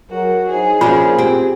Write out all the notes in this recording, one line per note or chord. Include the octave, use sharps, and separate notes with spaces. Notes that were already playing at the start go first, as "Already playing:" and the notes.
F#3 F#4 G#4 A#4
F#3 D#4 G#4 C5
F3 A#3 C#4 D4 F4
C4 G4